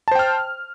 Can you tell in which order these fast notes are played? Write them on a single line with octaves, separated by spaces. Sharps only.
A5 C5 G5 F6